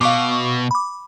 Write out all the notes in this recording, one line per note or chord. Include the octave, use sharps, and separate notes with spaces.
B2 F5 C#6 D6
B5 D6